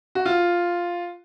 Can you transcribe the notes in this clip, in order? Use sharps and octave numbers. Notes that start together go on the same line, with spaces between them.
F#4
F4